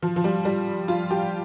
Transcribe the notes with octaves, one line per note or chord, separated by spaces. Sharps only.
F3
F3
G3
G3
F4
G4